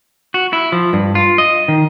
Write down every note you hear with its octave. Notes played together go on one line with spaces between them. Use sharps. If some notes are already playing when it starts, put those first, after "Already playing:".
F#4
E4
F3
G2
F4
D#5
D#3